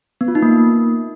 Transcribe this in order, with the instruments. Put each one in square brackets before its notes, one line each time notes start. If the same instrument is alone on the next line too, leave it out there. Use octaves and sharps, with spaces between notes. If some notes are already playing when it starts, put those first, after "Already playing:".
[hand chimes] B3
F4
D#4
A#3